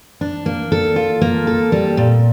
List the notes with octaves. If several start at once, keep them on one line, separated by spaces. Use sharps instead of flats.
D4
A#3
A4
F4
A#3
A4
G3
A#2